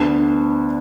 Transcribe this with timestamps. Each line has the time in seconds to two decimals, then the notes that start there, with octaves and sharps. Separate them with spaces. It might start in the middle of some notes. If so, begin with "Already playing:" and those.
Already playing: D2 D3 B3 D4